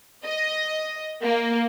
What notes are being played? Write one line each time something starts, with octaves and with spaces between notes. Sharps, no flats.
D#5
A#3